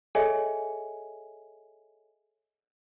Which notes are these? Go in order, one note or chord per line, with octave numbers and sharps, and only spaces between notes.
G#4 A4 C#5 D#5 E5 G#5